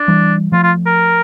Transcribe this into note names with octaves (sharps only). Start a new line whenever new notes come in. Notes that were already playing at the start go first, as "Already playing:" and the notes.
Already playing: D4
E3 G3
F3 A3 F4
F4
A#4